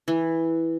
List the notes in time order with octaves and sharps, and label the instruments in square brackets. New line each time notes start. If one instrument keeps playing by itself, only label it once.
[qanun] E3